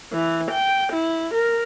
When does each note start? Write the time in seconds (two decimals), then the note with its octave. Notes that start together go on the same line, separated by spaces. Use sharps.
0.13 E3
0.51 G5
0.92 E4
1.34 A#4